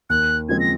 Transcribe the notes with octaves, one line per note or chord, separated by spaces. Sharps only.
D#2 F#6
C#3 F3 G#3 C4 G#6
A#6